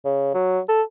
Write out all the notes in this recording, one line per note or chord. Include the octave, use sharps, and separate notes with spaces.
C#3
F#3
A4